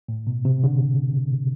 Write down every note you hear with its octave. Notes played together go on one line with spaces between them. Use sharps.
A2
B2
C3
D3